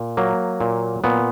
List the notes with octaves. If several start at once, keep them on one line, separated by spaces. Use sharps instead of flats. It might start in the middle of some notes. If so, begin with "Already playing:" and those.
Already playing: A#2
F#3 A#3
A#2
A#2 B3